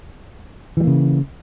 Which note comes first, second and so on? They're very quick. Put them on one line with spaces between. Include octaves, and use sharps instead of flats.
E3 G3 A#3 C#3